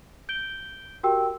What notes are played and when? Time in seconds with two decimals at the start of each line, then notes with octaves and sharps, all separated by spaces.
0.29 G6 D7 G7
1.03 F#4 G4 A#4 G5 E6